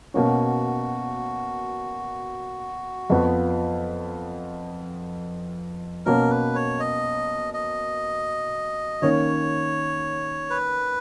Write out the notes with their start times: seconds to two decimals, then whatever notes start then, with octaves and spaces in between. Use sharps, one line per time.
0.14 B2 A#3 C#4 F#4
3.10 F2 F3 B3
6.05 B2 A#3 C#4 A#4
6.30 B4
6.55 C#5
6.80 D#5
7.54 D#5
9.02 D#3 A#3 C#4 C#5
10.50 B4